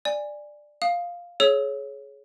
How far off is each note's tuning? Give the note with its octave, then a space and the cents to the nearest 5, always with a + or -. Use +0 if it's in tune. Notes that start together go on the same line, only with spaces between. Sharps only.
D5 +10 G#5 -15
F5 +0 D#6 +0
G#4 +25 C#5 +0 E6 +0